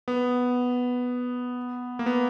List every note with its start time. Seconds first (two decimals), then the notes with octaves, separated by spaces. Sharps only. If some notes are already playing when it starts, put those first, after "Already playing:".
0.08 B3
1.99 A#3
2.06 B3